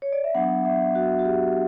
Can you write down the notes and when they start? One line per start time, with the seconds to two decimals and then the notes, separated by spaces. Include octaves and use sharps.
0.02 C#5
0.12 D5
0.24 E5
0.34 F#3 B3 D4 F#5
0.65 E5
0.95 F#4
1.19 F#4
1.25 G4